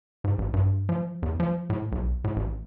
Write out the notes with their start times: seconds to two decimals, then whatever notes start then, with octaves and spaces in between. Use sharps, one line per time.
0.24 G#2
0.38 A1
0.54 G2
0.89 F3
1.22 E2
1.40 F3
1.70 A2
1.92 B1
2.24 A2
2.36 A1